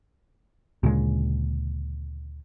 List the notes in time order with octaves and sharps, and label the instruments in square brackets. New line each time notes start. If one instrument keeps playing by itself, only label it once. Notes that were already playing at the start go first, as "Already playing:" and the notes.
[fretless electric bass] D2 A#2 C#3 G#3